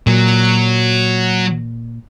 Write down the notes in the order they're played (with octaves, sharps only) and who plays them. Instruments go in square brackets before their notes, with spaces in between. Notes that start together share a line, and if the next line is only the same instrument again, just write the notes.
[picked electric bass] A#2 [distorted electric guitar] F#3